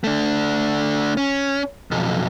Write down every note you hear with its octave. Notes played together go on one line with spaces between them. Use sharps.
A3 D4
C#4
B1 F2